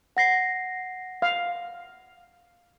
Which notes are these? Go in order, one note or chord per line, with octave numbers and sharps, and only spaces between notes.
F#5 A#6 C7
F5